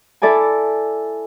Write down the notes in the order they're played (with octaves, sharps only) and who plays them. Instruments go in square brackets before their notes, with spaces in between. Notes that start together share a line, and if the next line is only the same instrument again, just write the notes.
[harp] E4 A4 D5 E5 G#5